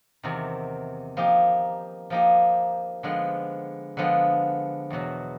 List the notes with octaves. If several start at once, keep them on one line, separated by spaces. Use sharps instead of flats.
E2 C3 D#3
F3 A#3 D#4 G4
F3 A#3 D#4 G4
D3 F3 G#3 B3
D3 F3 G#3 B3
E2 B2 F#3